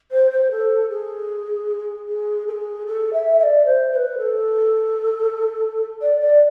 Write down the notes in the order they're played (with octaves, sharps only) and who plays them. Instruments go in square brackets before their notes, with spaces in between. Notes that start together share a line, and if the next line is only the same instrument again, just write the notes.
[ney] C5
C5
A4
G#4
G#4
A4
G#4
A4
E5
E5
D5
C5
C5
B4
A4
D5
D5